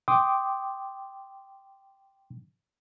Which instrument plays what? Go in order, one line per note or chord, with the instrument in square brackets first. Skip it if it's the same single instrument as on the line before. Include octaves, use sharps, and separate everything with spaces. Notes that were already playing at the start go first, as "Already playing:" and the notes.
[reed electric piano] G5 C6 D6 D#6